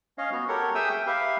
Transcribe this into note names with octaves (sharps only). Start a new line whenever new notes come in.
C#4 C#5 D#5 F5
B3 F#4
G4 A4 A#4 C#5 F#5
G#4 E5 G5 D#6 E6
G5
G4 B4 E5 F5